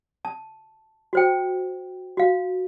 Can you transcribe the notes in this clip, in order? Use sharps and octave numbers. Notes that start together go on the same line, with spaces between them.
A5
F#4 C5 G5
F#4 F5